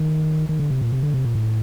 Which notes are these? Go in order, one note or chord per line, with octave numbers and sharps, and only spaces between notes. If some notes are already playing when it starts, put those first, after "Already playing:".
Already playing: D#3
D#3
D3
C3
A#2
C3
D3
C3
A#2
A2